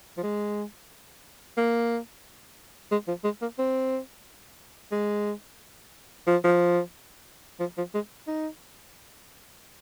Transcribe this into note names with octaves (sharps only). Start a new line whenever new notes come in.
F3
G#3
A#3
G#3
F3
G#3
A#3
C4
G#3
F3
F3
F3
F3
G#3
D#4